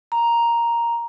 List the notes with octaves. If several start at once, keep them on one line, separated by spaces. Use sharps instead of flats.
A#5